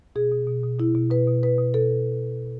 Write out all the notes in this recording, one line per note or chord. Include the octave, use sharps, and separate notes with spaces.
B2 G#4
B2
B2
B2
B2 E4
B2
B2 B4
B2
B2 B4
B2
B2 A4